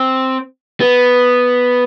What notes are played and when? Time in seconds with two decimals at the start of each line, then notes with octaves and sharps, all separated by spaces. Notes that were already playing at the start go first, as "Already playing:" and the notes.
Already playing: C4
0.81 B3